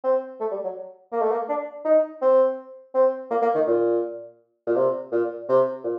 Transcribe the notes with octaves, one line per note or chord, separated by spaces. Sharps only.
C4
A3
G3
F#3
A#3
A3
A#3
D4
D#4
C4
C4
A#3
A#3
D#3
A#2
A#2
C3
A#2
C3
A#2